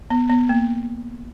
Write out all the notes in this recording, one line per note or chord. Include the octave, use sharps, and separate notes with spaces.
B3
B3
A#3